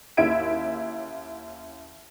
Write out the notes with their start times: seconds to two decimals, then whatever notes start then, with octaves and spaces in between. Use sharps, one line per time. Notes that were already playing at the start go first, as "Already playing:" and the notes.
0.17 D#2 C#4 E4 E5 G#6 D7